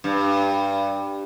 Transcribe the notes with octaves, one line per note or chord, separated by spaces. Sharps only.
G2